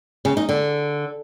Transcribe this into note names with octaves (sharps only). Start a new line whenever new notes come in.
C#3
D#4
D3